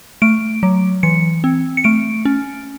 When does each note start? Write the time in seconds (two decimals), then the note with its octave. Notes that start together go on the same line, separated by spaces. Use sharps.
0.22 A3 D7
0.63 F#3
1.03 E3 C#7
1.44 C4
1.77 C#7
1.84 A3 D7
2.25 C#4